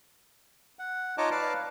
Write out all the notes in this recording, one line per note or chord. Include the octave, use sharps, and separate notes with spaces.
F#5
D#4 F4 C#5 D#5 A5 D6
B4 D5 F5 A5 D6